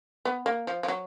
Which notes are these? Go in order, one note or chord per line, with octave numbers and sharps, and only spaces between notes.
B3
A#3
F3
F3
F#3